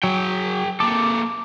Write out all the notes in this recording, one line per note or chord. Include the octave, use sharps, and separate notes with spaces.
F#3 G#4 G5
A#3 A4 D6